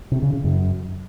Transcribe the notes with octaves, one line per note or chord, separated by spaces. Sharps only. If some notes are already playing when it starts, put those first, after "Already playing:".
C3
C#3
C#3
F#2